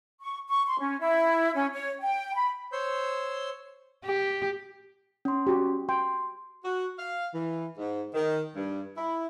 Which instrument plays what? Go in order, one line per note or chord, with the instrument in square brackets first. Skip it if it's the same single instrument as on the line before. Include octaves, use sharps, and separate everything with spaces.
[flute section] C#6
C#6
C6
C#4
E4
C#4
C#5
G5
B5
[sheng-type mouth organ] C5 C#5 C6 E6 G6
[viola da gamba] G4
[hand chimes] C#4 C6
[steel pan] F#4 G4
[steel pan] G5 [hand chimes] C6
[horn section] F#4
F5
E3
G#2
D#3
G2
E4